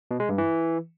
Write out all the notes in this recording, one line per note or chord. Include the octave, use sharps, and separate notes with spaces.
B2
G#3
G2
E3